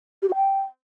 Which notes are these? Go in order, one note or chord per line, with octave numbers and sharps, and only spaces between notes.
G4
F#4
G5